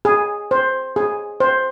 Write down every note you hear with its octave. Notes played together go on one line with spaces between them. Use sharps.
G#4
C5
G#4
C5